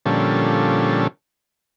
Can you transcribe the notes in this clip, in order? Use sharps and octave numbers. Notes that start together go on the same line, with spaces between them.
A#2 D3 F3 G3 C#4 A4